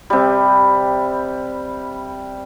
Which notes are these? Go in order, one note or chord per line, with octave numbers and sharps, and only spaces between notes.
C3 G3